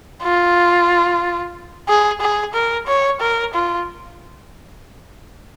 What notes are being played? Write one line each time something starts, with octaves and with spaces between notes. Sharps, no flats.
F4
G#4
G#4
A#4
C#5
A#4
F4